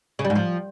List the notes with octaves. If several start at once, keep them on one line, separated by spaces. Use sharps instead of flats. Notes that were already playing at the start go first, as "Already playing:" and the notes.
C#3
G3
G#2
F3